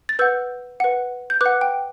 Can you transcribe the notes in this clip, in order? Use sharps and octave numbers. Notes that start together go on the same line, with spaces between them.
A6
B4 F#5 E6 G6
B4 F#5
G6
B4 F#5 D6 F#6
G5